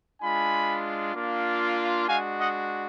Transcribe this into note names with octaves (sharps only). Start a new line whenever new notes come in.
G#3 D4 F4 G#5 B5
A#3 D4 F4
G#3 D4 F#4 F5 G#5
D#5 F#5